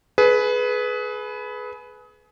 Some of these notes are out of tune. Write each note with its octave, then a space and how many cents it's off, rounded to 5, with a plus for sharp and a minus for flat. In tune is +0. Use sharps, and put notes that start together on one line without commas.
G#4 +30 B4 +0